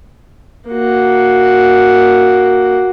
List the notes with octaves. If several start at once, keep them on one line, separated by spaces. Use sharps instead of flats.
A#3 F#4